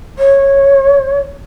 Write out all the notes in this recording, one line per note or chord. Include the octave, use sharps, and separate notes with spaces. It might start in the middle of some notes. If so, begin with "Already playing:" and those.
C#5